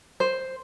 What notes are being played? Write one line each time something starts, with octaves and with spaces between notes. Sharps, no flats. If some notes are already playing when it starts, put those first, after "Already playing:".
C5